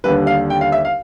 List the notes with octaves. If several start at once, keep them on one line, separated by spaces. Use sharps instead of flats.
D#2 D3 G3 B4
F5
G5
F5
E5
F5